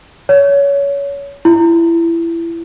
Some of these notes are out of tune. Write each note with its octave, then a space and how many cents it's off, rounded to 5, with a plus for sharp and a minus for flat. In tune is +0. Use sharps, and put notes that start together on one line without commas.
C#5 +20
E4 +25